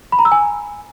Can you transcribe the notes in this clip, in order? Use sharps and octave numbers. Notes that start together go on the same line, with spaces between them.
B5
A#5
E6
G#5